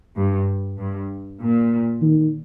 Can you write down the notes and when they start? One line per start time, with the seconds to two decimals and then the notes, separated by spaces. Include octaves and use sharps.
0.16 G2
0.78 G2
1.41 A#2
2.02 D#3